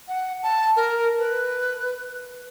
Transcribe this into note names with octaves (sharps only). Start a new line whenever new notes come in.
F#5
A5
A#4
B4